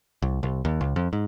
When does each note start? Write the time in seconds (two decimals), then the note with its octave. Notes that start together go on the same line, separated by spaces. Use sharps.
0.22 C2
0.43 C2
0.65 D#2
0.81 C#2
0.96 F2
1.13 G#2